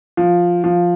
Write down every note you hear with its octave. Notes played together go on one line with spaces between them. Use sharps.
F3
F3